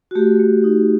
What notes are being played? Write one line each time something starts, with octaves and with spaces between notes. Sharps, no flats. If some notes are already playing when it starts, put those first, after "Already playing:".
F#4
A3 G4
A3
D#4